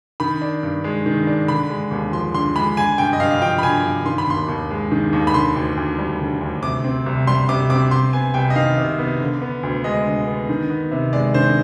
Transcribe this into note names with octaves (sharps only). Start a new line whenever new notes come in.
D#3 B5
D4
G2
G#3
D#3
D4
D3 B5
G#3
D#2
F3 C6
D3 C6
G#3 B5
D3 G#5
G2 G5
D#5
G2 F5
F5
F3 G5
B5
D3 G#5
G2
D#3 C6
B5
D#2 C6
D#2
G#3
D#3
D#2
B5
D3 C6
D2
D2
G3
D3
D2
C3 D6
C4
C2
G3 C6
C3 D6
C4 D6
C3 C6
B3 G#5
C2 G5
D#5
D#3 F5
C3
B3
D3
B3
D2
G#3 D#5
D3
B3
D#3
B3
C3
G#3 D5
D#3 C5